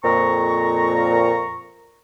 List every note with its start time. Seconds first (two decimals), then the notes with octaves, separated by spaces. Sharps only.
0.04 F2 A#2 A#5 C#6